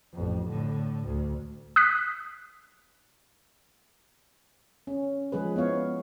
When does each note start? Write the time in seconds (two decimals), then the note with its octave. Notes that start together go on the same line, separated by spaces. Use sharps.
0.13 A1 F2
0.49 A2 D3
1.05 D2
1.76 D#6 F#6 B6
4.87 C#4
5.32 F3 G#3 G#4 B4
5.56 B3 E4 C#5 F5